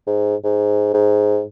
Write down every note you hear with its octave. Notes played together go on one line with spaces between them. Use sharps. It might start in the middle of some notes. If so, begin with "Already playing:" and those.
G#2
G#2
G#2